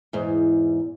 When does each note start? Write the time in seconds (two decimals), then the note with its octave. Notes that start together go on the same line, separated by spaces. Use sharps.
0.13 E2 G#2